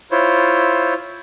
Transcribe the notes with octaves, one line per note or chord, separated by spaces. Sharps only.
E4 F4 C5 C#5